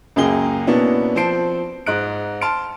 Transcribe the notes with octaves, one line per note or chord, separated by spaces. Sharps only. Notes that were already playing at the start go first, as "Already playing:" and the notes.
C#2 F#2 A#3 G#4 G5 G7
B2 A#3 B3 C#4 D4 E4
F3 C4 C5 A5 C7 D7
G#2 D#5 F#6 D7
A5 C6 F6 D7